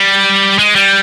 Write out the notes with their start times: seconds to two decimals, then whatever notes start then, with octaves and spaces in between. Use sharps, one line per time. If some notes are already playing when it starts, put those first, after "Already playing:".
Already playing: G3
0.59 G#3
0.76 G3